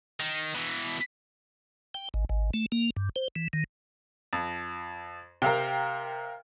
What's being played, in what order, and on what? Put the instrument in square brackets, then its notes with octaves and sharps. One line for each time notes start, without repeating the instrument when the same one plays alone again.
[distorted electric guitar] D#3
B2 E3
[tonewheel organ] G5
G#1
G#1
A3
A#3
G2
C5
E3
D#3
[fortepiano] F2
[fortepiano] C3 [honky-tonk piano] A#4 F5 G5